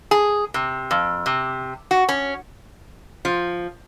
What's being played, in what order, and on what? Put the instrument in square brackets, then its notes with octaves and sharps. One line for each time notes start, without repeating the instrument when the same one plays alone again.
[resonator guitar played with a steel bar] G#4
C3
F2
C3
F#4
C#4
F3